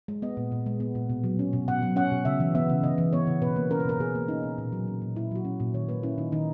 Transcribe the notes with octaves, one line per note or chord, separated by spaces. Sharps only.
G#3
B3 D#5
A#2
A#2
G#3
B3
A#2
B2
F#3
C#4
B2
B2 F#5
F#3
C#4 F#5
B2
C#3 E5
E3
B3 E5
C#3
C#3 D#5
E3
B3 C#5
C#3
B2 B4
A#3
C#4 A#4
B4
B2 A#4
B2 G#4
A#3
C#4 D#4
B2
A#2
F#3
C#4
A#2
A#2 E4
F#3 F#4
C#4
A#2
D#3 C#5
A#3 B4
C#4 E4
D#3 D#4
D#3 D#4